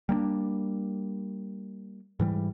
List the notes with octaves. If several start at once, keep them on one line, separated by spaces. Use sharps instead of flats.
G3 A#3 B3 D4
G#2 E3 G3